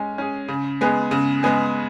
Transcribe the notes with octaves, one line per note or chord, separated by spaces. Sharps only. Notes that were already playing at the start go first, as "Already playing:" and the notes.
Already playing: G#3 C#4
C#4 G#4
C#3
G#3 B3 G#4
C#3
G#3 B3 G#4